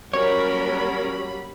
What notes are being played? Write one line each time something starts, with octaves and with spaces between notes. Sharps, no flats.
F#3 G3 A#3 C#4 A#4 C#5 B5